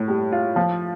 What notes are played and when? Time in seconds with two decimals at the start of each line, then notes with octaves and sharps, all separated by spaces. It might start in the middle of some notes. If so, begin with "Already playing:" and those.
Already playing: A2
0.08 G3
0.32 F4
0.56 F3